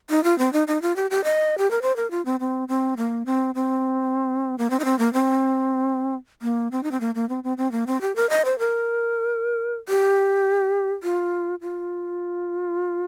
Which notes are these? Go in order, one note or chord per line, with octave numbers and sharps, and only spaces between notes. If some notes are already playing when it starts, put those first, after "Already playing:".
D#4
F4
C4
D#4
D#4
F4
G4
G4
D#5
G4
A#4
C5
A#4
F4
C4
C4
C4
A#3
C4
C4
A#3
C4
D#4
C4
A#3
C4
A#3
C4
D#4
C4
A#3
A#3
C4
C4
C4
A#3
C4
G4
A#4
D#5
C5
A#4
G4
F4
F4